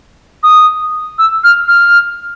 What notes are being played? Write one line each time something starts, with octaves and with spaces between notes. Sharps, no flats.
D#6
E6
F6
F6